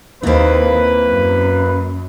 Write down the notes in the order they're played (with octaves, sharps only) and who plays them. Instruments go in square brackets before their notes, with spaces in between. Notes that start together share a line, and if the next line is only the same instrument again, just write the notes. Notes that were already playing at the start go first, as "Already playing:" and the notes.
[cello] D#2 [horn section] A#3 B4 [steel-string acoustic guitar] C4 E4
[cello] F#2